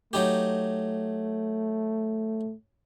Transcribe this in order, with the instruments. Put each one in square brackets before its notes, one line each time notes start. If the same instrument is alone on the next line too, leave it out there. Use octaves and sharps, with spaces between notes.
[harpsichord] F#3 D#4 G4 [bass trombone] A3